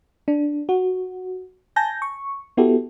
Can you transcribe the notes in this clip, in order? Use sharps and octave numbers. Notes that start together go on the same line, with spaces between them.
D4
F#4
G#5 A5 G6 A#6
C#6
B3 E4 F#4 G4 A4